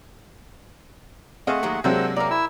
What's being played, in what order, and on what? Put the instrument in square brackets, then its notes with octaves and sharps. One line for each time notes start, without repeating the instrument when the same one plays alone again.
[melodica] A3 F#5 [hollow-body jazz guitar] C4 D#5 F5 [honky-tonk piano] G#4
[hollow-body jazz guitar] D#2 F#3 G#3
[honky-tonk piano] C3 F#3 G#3 [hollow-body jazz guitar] A#3 D4 [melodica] C5 F#5 E6
[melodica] A#3 A#5 [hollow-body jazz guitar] A#4 D5
[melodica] E4 E6